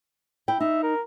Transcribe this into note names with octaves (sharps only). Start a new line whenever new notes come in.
E4 G5
D#4 E5
A#4